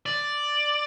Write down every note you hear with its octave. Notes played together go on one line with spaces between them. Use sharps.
D5